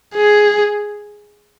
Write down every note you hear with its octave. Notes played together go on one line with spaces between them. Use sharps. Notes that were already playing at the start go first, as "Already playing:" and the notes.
G#4